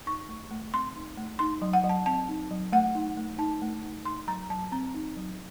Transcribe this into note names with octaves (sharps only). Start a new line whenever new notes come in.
D#4 C#6
A3
A3
C4 C6
D#4
A3
D#4 C6
F#3
F#5
F#3
A5
C4 A5
D#4
F#3
A3 F#5
D#4
A3
D#4 A5
A3
D#4
D#4 C6
F#3 A#5
F#3 A5
C4 A#5
D#4
F#3